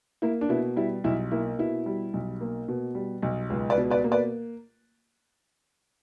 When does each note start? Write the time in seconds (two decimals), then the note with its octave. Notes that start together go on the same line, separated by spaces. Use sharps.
0.22 A#3 E4
0.41 D4
0.49 B2 E4
0.76 G3 E4
1.04 B1 E4
1.31 A#3 E4
1.59 B2 E4
1.86 G3
2.14 B1
2.41 A#3
2.68 B2
2.95 G3
3.22 B1
3.50 C#2
3.70 B4 D5
3.78 B2
3.90 B4 D5
4.04 A#3
4.11 B4 D5